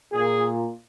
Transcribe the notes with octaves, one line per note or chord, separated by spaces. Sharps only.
A#2 G#4